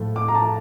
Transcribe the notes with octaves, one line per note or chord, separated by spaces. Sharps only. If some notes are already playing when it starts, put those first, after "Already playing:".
Already playing: A2 F3 A3
D6
A#5
A5